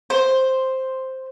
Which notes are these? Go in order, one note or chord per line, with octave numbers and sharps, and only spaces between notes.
C5